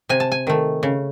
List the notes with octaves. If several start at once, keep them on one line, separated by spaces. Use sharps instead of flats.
C3 G#5
A5
G#5
D#3 A3
C#3